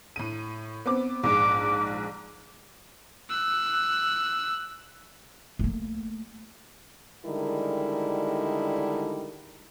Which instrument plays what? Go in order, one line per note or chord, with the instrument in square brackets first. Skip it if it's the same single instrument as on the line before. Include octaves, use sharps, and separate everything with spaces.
[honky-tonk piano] A2 D#7
B3 C4 D6
[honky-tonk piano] A#1 G#2 [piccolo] D6
[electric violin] E6 F#6
[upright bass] A3 A#3
[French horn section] D3 D#3 G3 G#3 E4 A#4